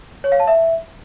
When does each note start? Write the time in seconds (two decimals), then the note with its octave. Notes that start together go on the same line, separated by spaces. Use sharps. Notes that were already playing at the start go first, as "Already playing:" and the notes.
0.24 C#5
0.32 F5
0.40 A5
0.47 E5